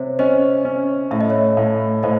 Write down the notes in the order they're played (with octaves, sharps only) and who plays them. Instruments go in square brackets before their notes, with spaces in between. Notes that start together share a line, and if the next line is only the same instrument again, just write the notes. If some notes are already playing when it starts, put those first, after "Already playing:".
Already playing: [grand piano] C3 [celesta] C5 C#5
[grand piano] C#4 [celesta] C5 D#5
[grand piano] C#4
[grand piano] A2 [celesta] E5
[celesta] D#5
C#5 E5
[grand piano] A2
[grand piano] A2 [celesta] C5 D#5